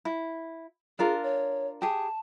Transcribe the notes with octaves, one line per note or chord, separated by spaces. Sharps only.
E4
D4 F4 G#4 A#4
C#5
G4 G#4 A5